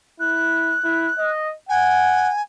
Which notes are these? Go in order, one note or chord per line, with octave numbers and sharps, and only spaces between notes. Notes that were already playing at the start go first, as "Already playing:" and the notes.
E4 F#6
E4
D#5
F#5 G#5